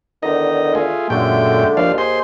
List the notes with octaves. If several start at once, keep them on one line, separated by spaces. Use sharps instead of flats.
E2 D3 D#3 D#4 D#5
A3 F4 G#4
F#2 A#2 D3 G#3 A3 G5
D#2 F3 D4 F5
G#4 C5 C6